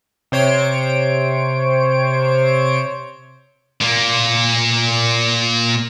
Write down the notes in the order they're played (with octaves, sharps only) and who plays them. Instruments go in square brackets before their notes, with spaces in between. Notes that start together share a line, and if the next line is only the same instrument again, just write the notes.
[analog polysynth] C3 C5 C#5 D7
[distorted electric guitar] A#2 A#3